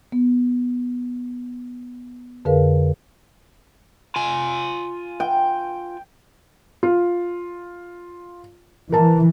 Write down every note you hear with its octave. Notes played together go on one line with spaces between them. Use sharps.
B3
F2 D3 G#4 A#4 B4 F5
F4 G#5
G5
F4
E3 A#4 A5